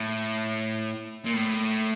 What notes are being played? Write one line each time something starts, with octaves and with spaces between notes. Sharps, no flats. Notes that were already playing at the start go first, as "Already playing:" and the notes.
Already playing: A2
A#2
A2